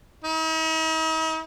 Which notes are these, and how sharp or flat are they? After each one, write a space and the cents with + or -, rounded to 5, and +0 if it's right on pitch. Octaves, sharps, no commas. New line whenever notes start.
D#4 +45